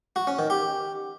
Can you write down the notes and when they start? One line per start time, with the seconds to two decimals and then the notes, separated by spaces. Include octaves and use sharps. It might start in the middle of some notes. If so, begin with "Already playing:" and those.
0.16 F#4
0.27 C#4
0.39 D#3
0.50 G4